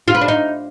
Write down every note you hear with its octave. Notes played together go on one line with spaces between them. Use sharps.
F4
B4
D4
D#4